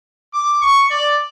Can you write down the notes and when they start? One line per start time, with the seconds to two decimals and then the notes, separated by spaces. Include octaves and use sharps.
0.34 D6
0.61 C#6
0.90 D5